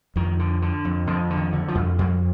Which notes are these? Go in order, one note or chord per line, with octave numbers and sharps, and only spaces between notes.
F2 D#3
D3
D3
F2
F2 D3
D3
D#3
D3
F3
F2
F2 G3